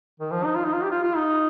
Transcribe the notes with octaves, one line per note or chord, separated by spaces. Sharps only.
D#3
F3
D#4
F4
D#4
F4
G4
F4
F4
D#4